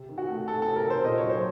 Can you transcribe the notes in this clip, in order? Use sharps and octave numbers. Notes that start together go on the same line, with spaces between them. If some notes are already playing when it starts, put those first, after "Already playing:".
Already playing: C3
D#3
F#4
A3
C3 A4
A4
C3
A#4
D#3
C5
A#2 D#5
C#5
F#3
C5